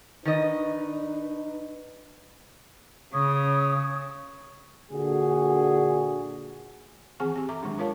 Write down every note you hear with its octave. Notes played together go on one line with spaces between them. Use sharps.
D#3 D4 D#4 B4 D#5
C#3 C#5 D#6
A#2 D3 F#4 G#4
D#3 E3 C4 G#4 F#5 G#5
C4 G4
A4 E5 A#5 D6
D#3 F#3 G#3 D4
D4 F4 A#4 C#5 F5 A5